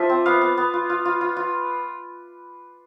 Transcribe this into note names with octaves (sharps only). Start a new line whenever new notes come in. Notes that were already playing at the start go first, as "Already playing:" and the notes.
Already playing: F3 F4 C5 D5 E5
C4
B3 F5
B3
B3
F4
F4
F4
F4
F4